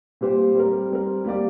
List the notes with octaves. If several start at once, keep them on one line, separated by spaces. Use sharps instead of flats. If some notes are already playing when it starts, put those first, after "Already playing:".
A#2 G3 C4 G4 C5
G3 C4 A#4
G3 C4 A#4
G3 A#3 G4 D5